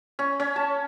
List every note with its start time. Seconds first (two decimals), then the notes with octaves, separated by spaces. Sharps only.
0.19 C#4
0.40 C#4
0.56 A5